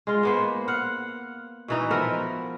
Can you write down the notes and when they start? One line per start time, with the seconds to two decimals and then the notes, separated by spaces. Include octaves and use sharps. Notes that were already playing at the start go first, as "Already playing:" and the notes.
0.07 G#3 F4
0.23 A#3 B3 C5
0.68 F5 F#5
1.68 B2 E3 D#4
1.91 F3 B3 A#4 E5